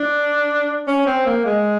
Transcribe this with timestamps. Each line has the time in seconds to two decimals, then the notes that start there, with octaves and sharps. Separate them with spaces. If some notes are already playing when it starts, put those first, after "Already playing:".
Already playing: D4
0.87 C#4
1.06 C4
1.26 A#3
1.45 G#3